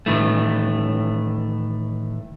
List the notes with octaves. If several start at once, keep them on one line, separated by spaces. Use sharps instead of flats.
A2 D#3 E3 A3